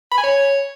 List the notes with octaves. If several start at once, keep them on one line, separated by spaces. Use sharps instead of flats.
B5
G#5
C#5